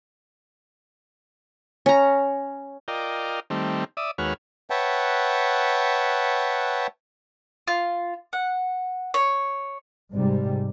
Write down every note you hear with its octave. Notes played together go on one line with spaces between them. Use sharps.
C#4 A#5
F4 A#4 D5 D#5 G5
D#3 G3 A3 C4
D5 E5 D#6
D#2 G#3 F#4 B4 C#5 F6
B4 C#5 E5 F#5 G5 A5
F4
F#5
C#5
G#2 C3 G3